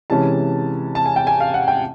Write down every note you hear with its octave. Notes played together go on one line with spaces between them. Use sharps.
C3 E3 G#3 C#4 A5
A5
G#5
G5
G#5
F5
F#5
G5